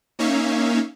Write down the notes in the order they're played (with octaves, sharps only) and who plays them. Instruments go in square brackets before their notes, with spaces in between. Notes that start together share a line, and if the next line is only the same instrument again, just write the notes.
[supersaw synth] A#3 C#4 D#4 C#5 E5 F5